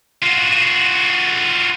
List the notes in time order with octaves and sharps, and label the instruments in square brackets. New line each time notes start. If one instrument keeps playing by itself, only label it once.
[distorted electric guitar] F4 F#4